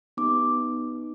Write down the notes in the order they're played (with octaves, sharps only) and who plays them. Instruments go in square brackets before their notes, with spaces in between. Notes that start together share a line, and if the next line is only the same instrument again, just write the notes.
[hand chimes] B3 D#4 G4 D6